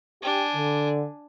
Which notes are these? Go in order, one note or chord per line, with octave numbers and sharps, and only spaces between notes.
D4 G4 G#5
D3